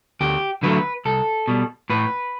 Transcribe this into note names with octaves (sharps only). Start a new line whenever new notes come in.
D2 G4
D3 F#3 A3 B4
C2 A4
B2 G3
A2 B4